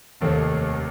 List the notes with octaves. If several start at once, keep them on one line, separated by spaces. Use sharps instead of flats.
F1 D#2 D#3 A3 C4